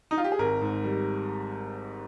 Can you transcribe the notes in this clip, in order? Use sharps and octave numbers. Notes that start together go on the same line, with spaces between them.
D#4
F4
G4
G#4
G#1 A#4
G#2
G3